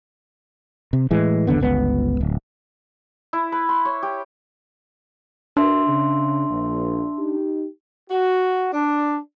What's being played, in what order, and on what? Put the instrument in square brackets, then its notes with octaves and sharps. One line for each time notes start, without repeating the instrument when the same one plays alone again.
[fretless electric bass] C3
A2 E3 G#3
F#1 E2 D3 B3
G1 C#2 B3
D1
[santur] E4
B4
C6
C#5
G4
[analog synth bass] D4 [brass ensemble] F#4 A#4 B4 [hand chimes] E5 C6 E6
[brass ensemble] C#3
A#1
D#4 G4
[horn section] F#4
D4